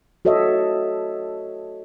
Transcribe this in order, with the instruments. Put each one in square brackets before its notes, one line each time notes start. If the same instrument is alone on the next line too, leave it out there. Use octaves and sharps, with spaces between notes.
[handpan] F#4 A4 C#5 D#5 E5